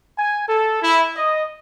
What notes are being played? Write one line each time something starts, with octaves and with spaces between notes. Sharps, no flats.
G#5
A4
E4
D#5